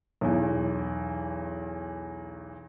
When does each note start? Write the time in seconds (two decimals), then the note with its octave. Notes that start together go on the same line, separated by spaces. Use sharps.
0.21 B1 E2